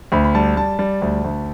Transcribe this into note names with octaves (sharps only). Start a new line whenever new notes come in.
D2 B5
B5
G3 A5
G3 A5
G3
D2
D2